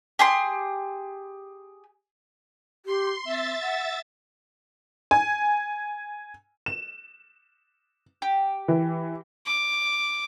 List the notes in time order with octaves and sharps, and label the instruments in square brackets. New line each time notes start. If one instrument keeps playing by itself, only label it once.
[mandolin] G4 G#4 C6
[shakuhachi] G4 [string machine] C6
[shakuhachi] C4 [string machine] E5 A6
[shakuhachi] F#5
[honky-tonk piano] G#5
E7
[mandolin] G4
[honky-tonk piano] E3
[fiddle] D6